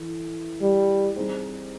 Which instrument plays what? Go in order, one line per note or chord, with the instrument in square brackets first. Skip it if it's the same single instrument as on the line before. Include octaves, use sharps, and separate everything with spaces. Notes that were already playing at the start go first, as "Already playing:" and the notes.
Already playing: [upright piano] E3 A4
[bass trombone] G3
[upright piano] G3 C4 D#4 G#4 C5